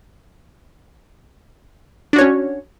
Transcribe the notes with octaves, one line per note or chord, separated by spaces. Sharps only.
C#4 D4 F#4 C#5